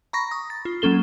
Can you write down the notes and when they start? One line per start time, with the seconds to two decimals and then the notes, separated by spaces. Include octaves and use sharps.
0.13 A#5 B5 C#6 A#6
0.31 D#6
0.50 A6
0.65 F4
0.82 F#3 A#3 C#4 A4 G7